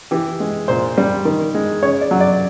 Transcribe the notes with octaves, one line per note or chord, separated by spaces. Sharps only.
E3 G4
G#3
A#2 C5
G3
D#3
G#3
C#3 C#5
D5
F#3
D5